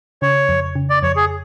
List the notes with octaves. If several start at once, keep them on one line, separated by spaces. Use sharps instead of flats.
C#3 C#5
F2
C#3
D5
F2 C#5
G#4